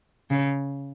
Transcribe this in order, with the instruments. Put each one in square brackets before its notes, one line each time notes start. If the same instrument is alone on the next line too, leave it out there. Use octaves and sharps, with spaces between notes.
[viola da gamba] C#3